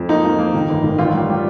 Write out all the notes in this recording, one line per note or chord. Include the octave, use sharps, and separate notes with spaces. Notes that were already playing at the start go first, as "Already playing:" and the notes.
Already playing: F2
A#3 D#4
F3
A#3
D#3
G1
D#3
A1 F4
G3
G3